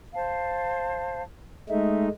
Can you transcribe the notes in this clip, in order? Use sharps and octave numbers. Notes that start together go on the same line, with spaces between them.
C5 F5 A5
G#3 A3 D#4 E5